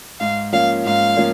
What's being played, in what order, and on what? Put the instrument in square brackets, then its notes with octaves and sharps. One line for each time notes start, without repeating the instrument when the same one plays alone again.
[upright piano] G#2 [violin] F5
[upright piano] F3 A#3 C#4 [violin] F5
[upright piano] G#2 [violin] F5
[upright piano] F3 A#3 C#4